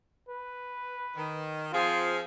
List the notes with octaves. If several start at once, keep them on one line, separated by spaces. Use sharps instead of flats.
B4
D#3
F3 C4 F4 G#4